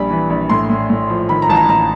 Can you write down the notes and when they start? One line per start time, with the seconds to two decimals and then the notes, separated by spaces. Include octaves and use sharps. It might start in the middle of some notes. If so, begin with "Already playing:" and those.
Already playing: A#1 G3 B5
0.10 E3
0.30 A#1
0.50 A2 C6
0.69 A2
0.90 A2
1.10 F3
1.29 D#3 B5
1.42 A#5
1.49 A1 A5
1.56 A#5
1.69 A1 A#5